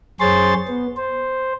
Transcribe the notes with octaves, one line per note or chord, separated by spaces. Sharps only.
F#2 G#4 C5 C#5 C6 A6
B3
C5